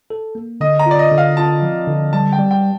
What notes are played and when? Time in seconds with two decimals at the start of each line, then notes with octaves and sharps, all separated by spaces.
0.10 A4
0.35 A#3
0.61 D3 D#5
0.79 A#5
0.86 F4 D5
0.99 D#5
1.12 D3
1.18 F5
1.37 F4 A5
1.62 F3
1.87 D3
2.13 G3 A5
2.32 G5
2.39 G3
2.51 G5